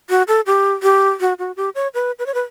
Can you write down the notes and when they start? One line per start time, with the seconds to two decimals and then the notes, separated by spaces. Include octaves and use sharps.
0.10 F#4
0.28 A4
0.46 G4
0.83 G4
1.21 F#4
1.39 F#4
1.57 G4
1.75 C#5
1.94 B4
2.19 B4
2.26 C#5
2.34 B4